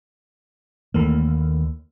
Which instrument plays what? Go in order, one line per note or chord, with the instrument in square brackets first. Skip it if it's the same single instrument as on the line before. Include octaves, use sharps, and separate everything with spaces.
[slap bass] D#2 D3 [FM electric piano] E3 A3 A#3